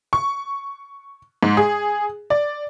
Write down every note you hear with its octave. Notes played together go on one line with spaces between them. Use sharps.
C#6
G#2
G#4
D5